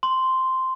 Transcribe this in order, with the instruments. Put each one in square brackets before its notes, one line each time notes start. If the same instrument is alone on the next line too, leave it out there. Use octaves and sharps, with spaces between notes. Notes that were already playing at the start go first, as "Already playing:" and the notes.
[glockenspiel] C6